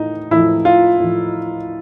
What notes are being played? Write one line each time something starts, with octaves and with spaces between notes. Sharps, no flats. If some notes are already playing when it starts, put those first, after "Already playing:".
Already playing: A2 D#4
A2 F3 E4
F4
A2 F3